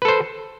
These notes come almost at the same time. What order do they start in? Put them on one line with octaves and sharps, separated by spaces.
B4 A4 C5